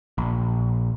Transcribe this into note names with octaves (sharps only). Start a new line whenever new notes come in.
A#1